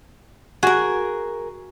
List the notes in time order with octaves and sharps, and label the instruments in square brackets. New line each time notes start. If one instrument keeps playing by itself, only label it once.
[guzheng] F#4 [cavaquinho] G#4 A#4